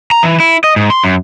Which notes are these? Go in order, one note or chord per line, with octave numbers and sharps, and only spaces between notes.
A#5
E3
E4
D#5
G#2
C6
F#2